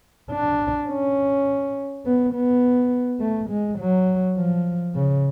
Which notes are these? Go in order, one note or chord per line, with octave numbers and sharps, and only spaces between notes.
D4
C#4
B3
B3
A3
G#3
F#3
F3
C#3